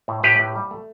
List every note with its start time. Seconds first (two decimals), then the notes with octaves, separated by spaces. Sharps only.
0.08 A2
0.23 A2 G4 B4
0.39 A2
0.55 G3
0.71 A3